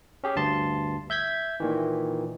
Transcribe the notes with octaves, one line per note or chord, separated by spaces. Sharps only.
C#4 G4 G#4
D2 G2 A5 C6
E5 G6 G#6 B6
A#2 D#3 E3